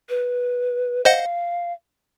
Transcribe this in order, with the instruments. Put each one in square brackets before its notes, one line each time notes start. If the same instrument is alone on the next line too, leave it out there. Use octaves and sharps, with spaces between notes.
[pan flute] B4
[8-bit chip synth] C5 D#5 F#5 [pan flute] F5